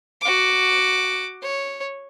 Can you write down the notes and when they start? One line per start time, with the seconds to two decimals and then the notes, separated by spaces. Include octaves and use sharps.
0.21 F#4 D6
1.42 C#5